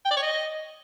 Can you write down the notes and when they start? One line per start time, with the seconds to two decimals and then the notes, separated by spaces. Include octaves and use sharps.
0.05 G5
0.11 D5
0.17 C#5
0.22 D#5